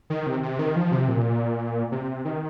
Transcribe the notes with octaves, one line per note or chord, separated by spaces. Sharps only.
D#3
C3
C3
D#3
F3
C3
A#2
C3
D#3